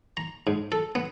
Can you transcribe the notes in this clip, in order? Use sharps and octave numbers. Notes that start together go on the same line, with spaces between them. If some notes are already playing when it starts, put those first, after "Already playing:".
A#5
G#2
A4
B3